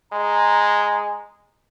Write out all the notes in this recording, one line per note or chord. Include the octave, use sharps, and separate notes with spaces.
G#3 A#5